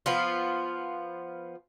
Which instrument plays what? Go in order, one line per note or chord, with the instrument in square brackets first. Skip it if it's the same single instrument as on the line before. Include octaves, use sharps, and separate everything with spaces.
[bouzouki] F3 B3 F4